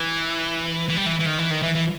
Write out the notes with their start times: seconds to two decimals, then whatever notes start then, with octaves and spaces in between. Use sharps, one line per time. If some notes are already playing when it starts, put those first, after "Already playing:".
Already playing: E3
0.89 E3
0.97 G3
1.06 E3
1.19 E3
1.26 D#3
1.38 E3
1.50 D#3
1.62 E3
1.74 E3